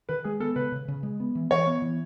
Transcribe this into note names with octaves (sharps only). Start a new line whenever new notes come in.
D#3 B4
G#3 G#4
B3 A4
C#3 B4
C#3
C#3
G#3
B3
E3
E3 C#5
B3
E3